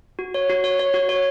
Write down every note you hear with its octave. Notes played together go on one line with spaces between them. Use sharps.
F#4
C#5
F#4
C#5
C#5
F#4
C#5